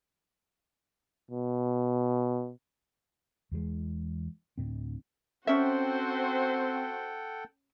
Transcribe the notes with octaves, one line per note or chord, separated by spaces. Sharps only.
B2
E2 E3 G3 G#3
D2 A2 C4
C4 C#4 F#4 A4 C5 E5 F#5 G5